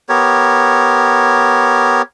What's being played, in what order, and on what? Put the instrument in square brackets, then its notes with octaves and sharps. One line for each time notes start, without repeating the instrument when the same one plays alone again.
[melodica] B3 G4 A#4 C#5